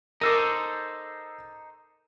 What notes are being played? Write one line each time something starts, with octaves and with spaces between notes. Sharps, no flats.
D#4 A4 A#4 C5 D6 E6 D#7